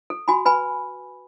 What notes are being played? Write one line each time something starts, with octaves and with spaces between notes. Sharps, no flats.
A4
F#4 G#5 B5
B4 G#5 B5